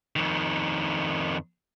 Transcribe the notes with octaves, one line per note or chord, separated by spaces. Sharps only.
F2 D#3